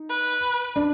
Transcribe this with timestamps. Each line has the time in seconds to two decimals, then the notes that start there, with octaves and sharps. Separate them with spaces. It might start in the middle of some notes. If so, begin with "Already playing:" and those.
Already playing: D#4
0.09 B4
0.76 D4